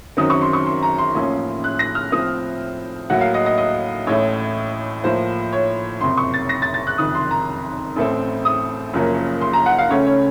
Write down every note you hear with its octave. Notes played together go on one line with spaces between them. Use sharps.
F#2 D#3 F#3 C4 D#6
C#6
C6
C#6
C6
A#5
C6
A1 A2 F3 A#3 C#4
F#6
A#6
F6
A2 F3 C4 D#6
A2 F#3 A#3 F#5
F5
D#5
D#5
D#5
A1 A2 A3 C#5
A2 F3 A#3 C5
C#5
F#1 F2 C3 C6
C#6
A6
A#6
A6
A6
F#6
F#1 F2 C3 D#3 D#6
C6
A#5
A1 A2 A3 C4
D#6
F#1 F#2 F3 A#3 C#4
C6
A#5
F#5
F5
C#2 C#3 A3 C#4 C#5
C#5